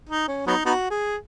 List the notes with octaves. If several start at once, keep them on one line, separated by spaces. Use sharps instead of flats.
D#4
C#4
F#3 B3 D#4
B3 D#4 F#4
G#4